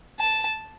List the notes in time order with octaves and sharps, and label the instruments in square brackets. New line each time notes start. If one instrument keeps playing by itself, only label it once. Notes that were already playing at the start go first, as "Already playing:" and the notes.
[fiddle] A5